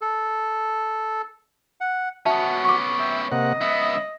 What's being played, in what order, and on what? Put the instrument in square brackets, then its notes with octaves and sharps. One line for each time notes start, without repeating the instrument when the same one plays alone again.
[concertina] A4
F#5
[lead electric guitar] B3 C#4 [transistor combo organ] F#4 [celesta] E5 A5
[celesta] C#6 D6
[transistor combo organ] E5 [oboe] G5
[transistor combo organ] C3 A#3 F#5 [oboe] D#5
[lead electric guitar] C#2 B3 [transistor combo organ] E5